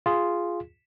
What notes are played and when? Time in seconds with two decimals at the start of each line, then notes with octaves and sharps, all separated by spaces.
0.06 F4 G#4